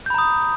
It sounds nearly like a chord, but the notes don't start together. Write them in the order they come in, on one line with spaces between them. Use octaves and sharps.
G6 B5 A#5 D#6